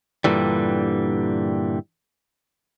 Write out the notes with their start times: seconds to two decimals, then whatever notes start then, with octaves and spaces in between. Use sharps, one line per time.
0.24 G2 A#2 D3 E3 G3